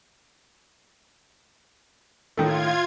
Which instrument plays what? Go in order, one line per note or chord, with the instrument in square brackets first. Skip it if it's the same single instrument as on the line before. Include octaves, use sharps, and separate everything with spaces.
[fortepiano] A2 D#3 A3 [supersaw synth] F4 G#6